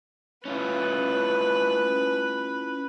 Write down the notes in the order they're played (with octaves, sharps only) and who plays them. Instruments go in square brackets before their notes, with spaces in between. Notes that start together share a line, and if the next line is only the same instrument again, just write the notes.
[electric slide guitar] C#4 E4 F4 [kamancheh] B4